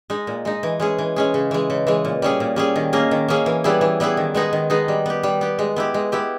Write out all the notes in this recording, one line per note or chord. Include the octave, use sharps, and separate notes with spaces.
G#3 D#4
A#2
G#3 D#4
E3
G#3 C#4 G#4
E3
G#3 C#4 G#4
C#3
E3 G#3
C#3
E3 G#3
A#2
G3 C#4 G#4
A#2
G3 C#4 G#4
D#3
A#3 C#4 G#4
D#3
A#3 C#4 G#4
E3
G3 B3 E4 G#4
E3
G3 B3 E4 G#4
D#3
G#3 B3 D#4 G#4
D#3
G#3 B3 D#4 G#4
G3
B3 G4
G3
B3 G4
G#3
B3 E4 G4
G#3
B3 E4 G4